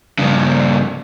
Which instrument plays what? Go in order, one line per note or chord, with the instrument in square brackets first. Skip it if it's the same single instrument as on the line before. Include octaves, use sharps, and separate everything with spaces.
[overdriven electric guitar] G2 C#3